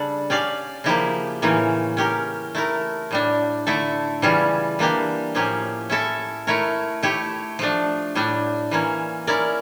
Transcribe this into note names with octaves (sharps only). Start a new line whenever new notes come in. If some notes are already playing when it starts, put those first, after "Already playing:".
Already playing: C#3 G3 D4 A4 D5
C#4 G4 D5 F5
C#3 F3 A#3 E4 G4
A2 E3 A#3 C#4
C#4 G4 A#4
A3 E4 A#4
A2 G3 D4
D3 A3 E4 A4 E5
C#3 E3 G3 C#4 F4
E3 A#3 D4 G4
A2 F3 A#3 C#4 G4
C#4 E4 A4 E5
A3 E4 A#4 C#5
A3 E4 G4 C#5
F3 A3 D4
A2 G3 D4
E3 A#3 C#4
C#4 E4 A#4 D5